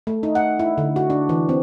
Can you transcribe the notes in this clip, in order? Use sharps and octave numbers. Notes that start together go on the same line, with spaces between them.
A3
D#4
F#5
E4
D3
F#4
D4
E3
C4